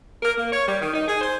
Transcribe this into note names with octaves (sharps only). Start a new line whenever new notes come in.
A#4
A#3
C#5
G3
D#3
D#4
G#4
C5